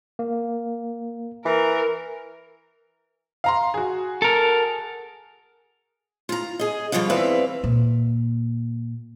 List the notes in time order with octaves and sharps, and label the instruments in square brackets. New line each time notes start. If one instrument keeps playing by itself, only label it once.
[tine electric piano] A#3
[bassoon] E3 [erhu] A#4
[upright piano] F5 A#5 C6
F#4 G#4
[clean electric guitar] A4 A#4
[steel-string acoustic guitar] F4 A#5
G#4 D#5
B2 F3 G3 F4 F5
E2 C4 B4 D5 E5 F5
[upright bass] A#2